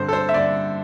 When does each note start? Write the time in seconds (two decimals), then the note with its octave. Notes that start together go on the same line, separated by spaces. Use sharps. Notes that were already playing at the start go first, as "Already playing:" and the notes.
Already playing: G2 D3 C4 C5
0.08 A4
0.13 C5
0.29 E5
0.33 G2 D3 C4 D5